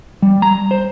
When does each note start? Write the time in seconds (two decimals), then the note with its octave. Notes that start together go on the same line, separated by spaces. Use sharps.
0.22 G3
0.42 A#5
0.71 C5